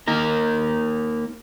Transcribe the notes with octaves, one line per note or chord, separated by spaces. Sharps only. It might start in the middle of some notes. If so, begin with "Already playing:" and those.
A#3 D#4 A#4